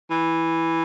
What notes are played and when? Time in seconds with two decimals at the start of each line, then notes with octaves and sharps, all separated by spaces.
0.10 E3